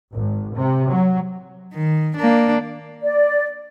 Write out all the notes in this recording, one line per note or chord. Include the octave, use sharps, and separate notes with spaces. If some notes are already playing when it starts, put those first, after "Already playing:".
G#1
C3
F#3
D#3
A#3 D4
D5